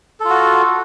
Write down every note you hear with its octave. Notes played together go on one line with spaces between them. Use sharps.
F4 F#4 A4